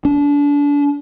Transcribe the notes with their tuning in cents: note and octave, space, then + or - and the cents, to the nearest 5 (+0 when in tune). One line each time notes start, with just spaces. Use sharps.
D4 -30